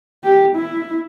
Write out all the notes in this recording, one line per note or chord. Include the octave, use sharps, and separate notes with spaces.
G4
E4